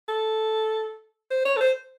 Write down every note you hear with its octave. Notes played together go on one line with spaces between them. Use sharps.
A4
C5
C#5
A4
C5